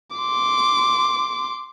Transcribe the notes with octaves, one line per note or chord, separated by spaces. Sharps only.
C6 D6